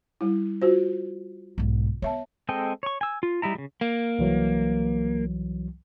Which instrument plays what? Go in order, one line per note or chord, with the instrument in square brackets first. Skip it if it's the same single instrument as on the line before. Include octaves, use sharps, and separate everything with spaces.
[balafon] G3 E4
F4 F#4 C5
[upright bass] B1 G#2
[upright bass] B3 [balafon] C#5 E5 A5
[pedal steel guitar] G#3 C4 A4 D#5 G5
C#5 C#6
G#5 E6
F4
G3 D#4 E4 A#5
C#3 G3
[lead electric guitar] A#3
[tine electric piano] C2 E3 F#3